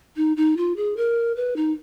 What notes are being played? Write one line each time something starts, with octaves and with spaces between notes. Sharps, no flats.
D#4
D#4
F4
G#4
A#4
B4
D#4